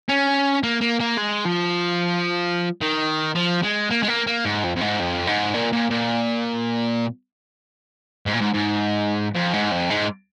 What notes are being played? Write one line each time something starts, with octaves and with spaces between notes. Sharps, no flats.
C#4
A#3
A#3
A#3
G#3
F3
D#3
F3
G#3
A#3
G#3
A#3
A#3
G#2
F2
F2
G#2
F2
G#2
A#2
A#2
A#2
G#2
A#2
G#2
G#2
F2
G#2
F2
G#2